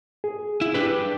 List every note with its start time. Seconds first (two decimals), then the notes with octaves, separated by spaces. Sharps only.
0.24 G#4
0.61 E4
0.74 D4 G4 B4